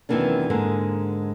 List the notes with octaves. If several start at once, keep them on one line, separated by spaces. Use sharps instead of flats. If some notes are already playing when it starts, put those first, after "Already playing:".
F#2 C3 D#3 E3 A#3 D4
G#2 D3 G#3 A#3